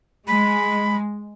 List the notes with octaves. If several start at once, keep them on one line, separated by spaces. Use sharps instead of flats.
G#3 B5